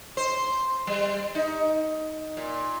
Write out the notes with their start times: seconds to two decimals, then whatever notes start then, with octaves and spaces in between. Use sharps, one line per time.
0.17 C5
0.87 G3
1.35 D#4
2.37 A#2